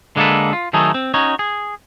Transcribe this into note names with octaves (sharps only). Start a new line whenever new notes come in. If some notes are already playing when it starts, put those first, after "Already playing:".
D3 G#3 A#3 B3 A4 B4
F4
D#3 F#3 A3 D#4 G#4 A4
C4
C#4 D#4 F#4 C#5
G#4